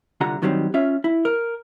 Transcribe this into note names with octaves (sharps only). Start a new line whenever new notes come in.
C2 D3 G3 F4 F#5 A#5
G2 D#3 F#3 G3 A#3 C4
C#4 F4 E5
E4
A#4